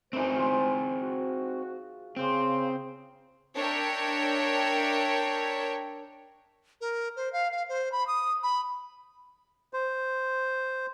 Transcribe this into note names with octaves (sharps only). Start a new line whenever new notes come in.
F#2 E3 A3 C4 D#4 C5
F4 G#4
F#4
C#3 C4 G4 C5 F5
D4 A#4 C#5 E5 G5
A#4
C5
F5
F5
C5
B5
D#6
B5
C5